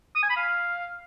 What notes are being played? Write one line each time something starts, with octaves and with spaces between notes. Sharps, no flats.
D#6
G#5
B5
F5